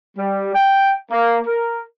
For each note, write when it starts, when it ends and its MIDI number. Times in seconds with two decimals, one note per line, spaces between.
0.18 0.51 55
0.55 0.95 79
1.12 1.40 58
1.47 1.82 70